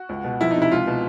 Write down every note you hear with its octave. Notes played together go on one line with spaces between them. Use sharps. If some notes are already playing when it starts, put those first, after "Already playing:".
Already playing: F#4
C#2
B2
F3 E4
D#4
C3
E4
C#2 F4
B2